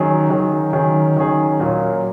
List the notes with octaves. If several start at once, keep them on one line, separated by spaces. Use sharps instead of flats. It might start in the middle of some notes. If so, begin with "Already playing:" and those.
Already playing: D#3 F#3 C#4 G#4
D#3 F#3 C#4 G#4
D#3 F#3 C#4 G#4
D#3 F#3 C#4 G#4
A#2 F#3 A#3 C#4